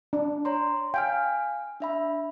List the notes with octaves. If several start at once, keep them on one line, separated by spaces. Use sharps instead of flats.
D4
C#5 A#5 C6
F5 G5 G#5 F6
D4 E5 B5